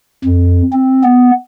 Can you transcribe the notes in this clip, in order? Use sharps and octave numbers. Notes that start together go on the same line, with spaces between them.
F2
C4
B3